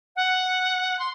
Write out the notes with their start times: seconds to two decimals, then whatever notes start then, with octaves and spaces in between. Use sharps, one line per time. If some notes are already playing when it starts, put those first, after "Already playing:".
0.16 F#5
0.99 C6